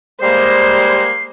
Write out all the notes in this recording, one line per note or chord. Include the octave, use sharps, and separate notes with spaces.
G3 G#3 A#3 C5 C7